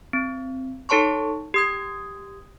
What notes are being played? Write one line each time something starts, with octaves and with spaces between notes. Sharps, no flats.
C4
D#4 A4 C#5 A5 C6 C#6
G4 D#6 G#6